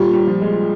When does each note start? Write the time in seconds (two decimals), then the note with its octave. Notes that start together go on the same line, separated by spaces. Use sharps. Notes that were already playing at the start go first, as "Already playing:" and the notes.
Already playing: A#2 G3
0.13 G3
0.27 F3
0.41 G#3